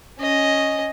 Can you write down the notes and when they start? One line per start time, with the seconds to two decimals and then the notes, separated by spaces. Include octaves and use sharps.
0.18 C#4 D#5